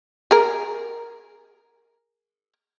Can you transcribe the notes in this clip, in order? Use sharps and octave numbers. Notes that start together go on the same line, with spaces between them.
G#4 A#4